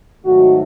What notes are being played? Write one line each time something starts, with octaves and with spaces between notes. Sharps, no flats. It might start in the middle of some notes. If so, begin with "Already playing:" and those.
G#2 D#3 F#3 A3 F#4